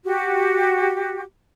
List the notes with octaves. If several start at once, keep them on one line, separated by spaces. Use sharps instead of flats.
F#4 G4